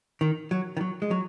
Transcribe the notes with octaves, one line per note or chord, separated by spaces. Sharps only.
D#3
F#3
D#3
F#3
G#3
F#3